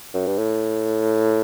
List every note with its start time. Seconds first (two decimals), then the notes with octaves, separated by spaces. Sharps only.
0.14 F#2
0.27 G2
0.38 A2